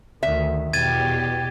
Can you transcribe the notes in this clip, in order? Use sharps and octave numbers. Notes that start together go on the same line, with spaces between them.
D2 D#3 E5
E2 B2 G4 G#6 A6 D#7